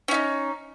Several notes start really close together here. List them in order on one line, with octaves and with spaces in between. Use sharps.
C#4 E4 D#4